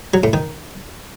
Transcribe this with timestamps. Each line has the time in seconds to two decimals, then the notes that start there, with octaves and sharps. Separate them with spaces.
0.14 F#3
0.24 A2
0.33 D#3